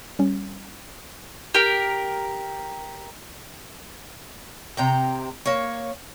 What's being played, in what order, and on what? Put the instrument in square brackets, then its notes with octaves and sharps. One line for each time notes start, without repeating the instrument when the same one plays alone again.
[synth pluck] G3 C#4
[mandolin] G4 A#4
[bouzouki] C3 G5 A#5
A#3 C#5